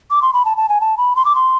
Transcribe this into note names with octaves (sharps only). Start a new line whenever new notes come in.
D6
C6
B5
A5
A5
G#5
A5
B5
C6
D6
C6